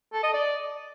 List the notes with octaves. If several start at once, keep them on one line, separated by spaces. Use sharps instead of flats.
A4
D#5
D5